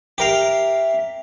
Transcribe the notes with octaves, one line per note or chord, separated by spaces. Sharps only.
G4 A#4 E5 F5